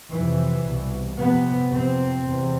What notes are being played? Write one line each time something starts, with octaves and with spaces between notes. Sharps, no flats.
F2 C3 E3
C2
B2
F2 C3 B3
F2 C3 C4
E2 C3